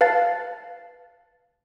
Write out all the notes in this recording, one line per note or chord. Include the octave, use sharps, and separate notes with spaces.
B4 F5 A5 A6